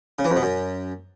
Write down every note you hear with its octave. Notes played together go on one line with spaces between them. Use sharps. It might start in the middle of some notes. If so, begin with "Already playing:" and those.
C#3
E3
F2
B2
F#2